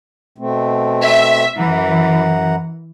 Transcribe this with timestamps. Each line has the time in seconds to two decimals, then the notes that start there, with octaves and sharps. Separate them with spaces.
0.38 B2 A3 C4
1.03 E5
1.58 F#2 E3 F#5 A#5